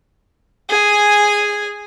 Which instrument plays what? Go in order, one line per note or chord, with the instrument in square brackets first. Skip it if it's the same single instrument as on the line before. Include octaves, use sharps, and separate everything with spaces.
[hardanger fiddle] G#4 G#5